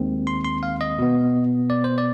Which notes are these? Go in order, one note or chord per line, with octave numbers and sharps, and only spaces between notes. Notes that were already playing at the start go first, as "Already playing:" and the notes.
Already playing: D#2 D#3 G#3 C4
C6
C6
F5
D#5
B2 B3
D5
C5
D5